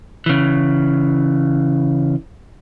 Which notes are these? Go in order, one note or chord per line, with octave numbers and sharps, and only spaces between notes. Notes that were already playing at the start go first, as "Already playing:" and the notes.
C#3 E3